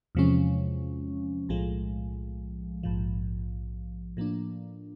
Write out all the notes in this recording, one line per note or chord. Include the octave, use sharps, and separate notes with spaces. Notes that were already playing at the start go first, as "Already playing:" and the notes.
E2 C3 F3 G#3 C#4
B1 A2 F3 G#3
A#1 G#2 F3
A2 F3 A#3 D4